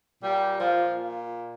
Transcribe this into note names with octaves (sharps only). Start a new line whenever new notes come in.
A#2 G3 A#3 G4
F3 F4